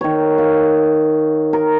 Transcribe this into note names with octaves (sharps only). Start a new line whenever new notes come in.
D#3 C#5
F5
A#4